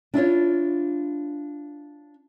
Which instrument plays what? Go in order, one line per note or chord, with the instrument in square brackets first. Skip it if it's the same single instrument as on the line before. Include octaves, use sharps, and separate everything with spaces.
[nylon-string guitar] D4 E4 F4 C#5